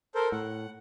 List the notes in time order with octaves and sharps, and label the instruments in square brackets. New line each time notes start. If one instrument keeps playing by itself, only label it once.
[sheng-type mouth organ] A4 A#4 C5
[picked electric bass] A2 [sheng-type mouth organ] F#5